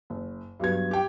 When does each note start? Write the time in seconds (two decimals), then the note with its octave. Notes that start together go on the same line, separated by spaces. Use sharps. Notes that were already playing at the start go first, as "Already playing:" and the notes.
0.10 F#1
0.60 G2 F#3 B3 G#6
0.91 G4 G5